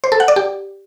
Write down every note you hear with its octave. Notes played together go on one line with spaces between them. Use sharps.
C5
A4
F#5
D5
G4